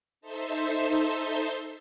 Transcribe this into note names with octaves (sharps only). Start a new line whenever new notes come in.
D#4 A4 C5 E5 C6